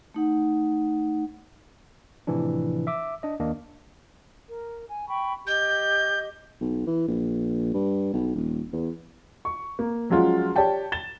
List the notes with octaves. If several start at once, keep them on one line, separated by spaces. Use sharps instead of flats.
A3 D#4 F#5
A2 C3 E3 F3 D4
E5 D6
D4 D#5
D#2 A#3 D4 D#5
A#4
G#5
G5 B5 C#6
G4 D#5 G6
B1
E3
A#1
G2
B1
D#1
E2
C#6
A#3
F3 F#3 G#3 C#4 F4 F#4
G4 C#5 D5 G5 A5
A6 E7 G7